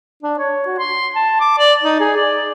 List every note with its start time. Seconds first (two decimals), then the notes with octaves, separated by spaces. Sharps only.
0.23 D4
0.38 C#5
0.66 F#4
0.78 C6
1.15 A5
1.40 D6
1.58 D5
1.83 D#4
2.00 G#4
2.16 D5